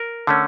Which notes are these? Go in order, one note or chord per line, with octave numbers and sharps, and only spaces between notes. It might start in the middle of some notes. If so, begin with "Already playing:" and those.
Already playing: A#4
D3 A3 C#4